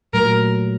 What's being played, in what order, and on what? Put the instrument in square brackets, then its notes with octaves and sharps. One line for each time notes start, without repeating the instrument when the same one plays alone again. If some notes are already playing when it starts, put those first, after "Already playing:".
[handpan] A#2 F#3 A3 [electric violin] A#4